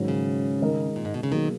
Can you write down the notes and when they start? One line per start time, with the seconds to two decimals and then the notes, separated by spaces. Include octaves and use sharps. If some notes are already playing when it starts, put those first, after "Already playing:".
Already playing: G#2 D#3 F#3 C#4
0.08 C#3
0.61 D#3 G#3 D#4 A#4 D#5
0.96 A#2
1.05 G#2
1.14 B2
1.23 C#3
1.32 B1 B2 D#3 A#3 C#4 G#4